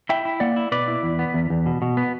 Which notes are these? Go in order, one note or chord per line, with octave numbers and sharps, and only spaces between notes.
E4 E5 G5
E4
A#3 D5 F#5
E4
B2 B4 D5
E4
E2
B3
E2
E2
B2
B2
B3